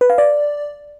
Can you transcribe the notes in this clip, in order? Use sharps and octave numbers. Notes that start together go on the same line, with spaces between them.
B4
F5
D5